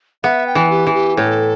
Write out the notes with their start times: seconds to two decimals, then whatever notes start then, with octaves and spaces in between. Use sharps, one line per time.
0.23 B3 E5
0.47 G5
0.55 E3
0.70 G4
0.87 E3
0.94 G4
1.17 A2 A4